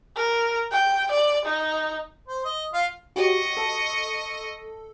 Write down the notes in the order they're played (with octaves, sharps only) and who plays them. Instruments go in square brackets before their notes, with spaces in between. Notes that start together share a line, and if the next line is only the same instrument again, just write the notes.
[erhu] A#4
G5
D5
D#4
[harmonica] C5
D#5
F4 F5
[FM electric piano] F#4 G4 C#5 [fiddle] D#5 C#6
[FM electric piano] A4